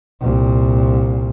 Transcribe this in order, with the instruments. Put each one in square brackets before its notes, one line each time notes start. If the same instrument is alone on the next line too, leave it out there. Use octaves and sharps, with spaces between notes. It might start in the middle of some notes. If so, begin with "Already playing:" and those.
[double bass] C2 A#2